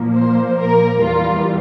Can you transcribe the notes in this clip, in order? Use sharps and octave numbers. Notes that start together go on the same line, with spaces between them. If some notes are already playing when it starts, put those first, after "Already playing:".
Already playing: A#2 F3 A#3
C5
A#4
E2 E3 G3 F4